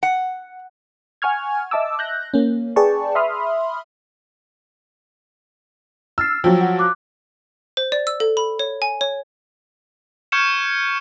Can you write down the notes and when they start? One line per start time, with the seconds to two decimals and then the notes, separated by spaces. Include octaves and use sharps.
0.03 F#5
1.22 F#5 G#5 C#6 F6 G#6
1.71 D#5 E5 A5 D6 E6
1.99 F#6 G6 A#6
2.34 A#3 C#4
2.76 G#4 B4 D5 G5 A5 C#6
3.15 E5 B5 C6 D#6 F6
6.18 E6 F6 A6 C7
6.44 F3 F#3 G5
6.61 F#5
6.79 D6 F#6
7.77 C5
7.92 D5
8.07 E6
8.20 A4
8.37 B5
8.59 C#5
8.82 G#5
9.01 C#5
10.32 C#6 F6 G6 G#6 C#7 E7